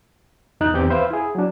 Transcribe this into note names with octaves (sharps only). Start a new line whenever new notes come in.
E2 D#4 F#6
E2 C4 G4 G6
B4 C5 E5 F5
E4 G#4
F#3 D4